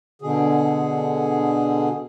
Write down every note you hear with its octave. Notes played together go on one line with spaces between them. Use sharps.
B2 D3 G#4